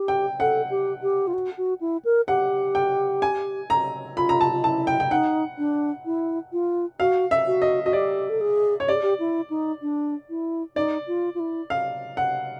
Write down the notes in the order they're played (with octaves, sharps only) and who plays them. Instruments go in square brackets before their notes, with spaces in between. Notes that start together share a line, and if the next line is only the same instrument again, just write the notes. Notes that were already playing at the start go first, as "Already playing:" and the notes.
Already playing: [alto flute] G4
[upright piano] G5
[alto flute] A4 [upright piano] F#5
[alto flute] G4
G4
F4
F#4
F#4
E4
A#4
[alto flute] G4 [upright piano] F#5
[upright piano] G5
G#5
A#5
[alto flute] F4 [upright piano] B5
[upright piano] A#5
A5
[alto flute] F4
[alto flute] E4 [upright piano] A5
[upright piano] G5
G5
[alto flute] D#4 [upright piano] F#5
[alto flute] D4
E4
F4
[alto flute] F#4 [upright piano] F5
[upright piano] E5
[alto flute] F#4
[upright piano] D#5
[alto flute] F#4 [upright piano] D#5
[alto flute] G4 [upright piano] D5
[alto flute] A4
G#4
[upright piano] C#5
[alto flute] G4 [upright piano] D5
[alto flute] G#4
G4
E4
D#4
D4
E4
[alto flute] D#4 [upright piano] D5
[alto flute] F4
F4
E4
[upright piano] F5
F#5